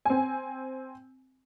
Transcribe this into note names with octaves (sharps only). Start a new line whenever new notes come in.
C4 G#5